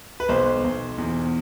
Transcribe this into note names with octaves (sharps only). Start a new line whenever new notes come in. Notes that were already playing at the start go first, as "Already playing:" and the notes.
B4
B1 C5
B1
E2